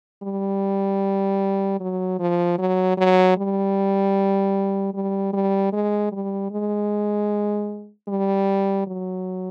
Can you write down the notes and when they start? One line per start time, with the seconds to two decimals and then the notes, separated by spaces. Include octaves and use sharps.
0.23 G3
1.80 F#3
2.19 F3
2.58 F#3
2.98 F#3
3.37 G3
4.94 G3
5.33 G3
5.72 G#3
6.12 G3
6.51 G#3
8.08 G3
8.87 F#3